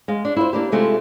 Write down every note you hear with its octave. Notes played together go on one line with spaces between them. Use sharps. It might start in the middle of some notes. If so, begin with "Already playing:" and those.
G#3 F5
D4
E4 F4 C5
A#3 D4 G4
C3 G#3 A3 C4 F4 G4